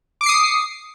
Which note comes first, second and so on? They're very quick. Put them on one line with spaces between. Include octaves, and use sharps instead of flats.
D6 C#7 C7 D#6